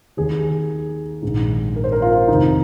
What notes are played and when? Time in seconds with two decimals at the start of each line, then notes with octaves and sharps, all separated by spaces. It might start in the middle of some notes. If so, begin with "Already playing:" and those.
0.17 D#2 D#3 G#4
1.22 A#1 G#2 D#3
1.76 A#4
1.84 C5
1.92 A#4
2.02 F4
2.28 F1 D#2 D#3 D#4